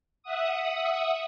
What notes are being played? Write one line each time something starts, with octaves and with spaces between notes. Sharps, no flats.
E5 F#5 D#6